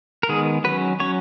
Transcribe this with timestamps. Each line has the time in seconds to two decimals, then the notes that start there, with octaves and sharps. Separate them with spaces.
0.23 A#4
0.29 D#3 G#3 B3 G#4
0.64 F#3 C#4 B4
1.00 F#3 C#4 C#5